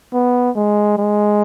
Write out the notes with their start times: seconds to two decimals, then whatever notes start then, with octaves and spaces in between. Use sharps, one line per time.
0.13 B3
0.55 G#3
0.97 G#3